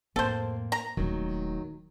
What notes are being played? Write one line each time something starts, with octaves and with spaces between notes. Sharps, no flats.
F2 A2 A#3 C4 A4 C5
A#5
D#1 D#3 F#3 A3